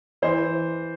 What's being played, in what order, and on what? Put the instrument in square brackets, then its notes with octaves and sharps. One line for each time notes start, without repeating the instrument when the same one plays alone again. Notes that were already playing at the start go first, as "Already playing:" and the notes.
[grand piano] E3 C5